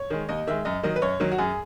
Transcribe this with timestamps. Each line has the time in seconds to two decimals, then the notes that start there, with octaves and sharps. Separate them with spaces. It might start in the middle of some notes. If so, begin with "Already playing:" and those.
Already playing: C#5
0.10 D#3 G#3
0.29 D#2 D#5
0.47 D#3 G#3 E5
0.65 F#2 D#5
0.83 D#3 F#3 D#5
0.96 B4
1.02 F#2 C#5
1.20 D#3 F#3
1.32 F#4
1.38 F#2 G#4